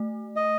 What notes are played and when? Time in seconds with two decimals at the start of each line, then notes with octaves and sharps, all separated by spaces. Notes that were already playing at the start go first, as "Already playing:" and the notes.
Already playing: A3
0.36 D#5